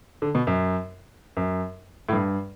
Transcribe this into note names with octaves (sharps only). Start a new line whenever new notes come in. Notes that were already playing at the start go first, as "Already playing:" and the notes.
D3
B2
F#2
F#2
A2
G2